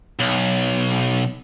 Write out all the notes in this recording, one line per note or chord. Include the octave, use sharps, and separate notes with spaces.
B1